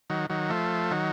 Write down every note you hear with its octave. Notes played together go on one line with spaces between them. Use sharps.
D#3 F#3
D#3 F#3
F3 A3
D#3 F#3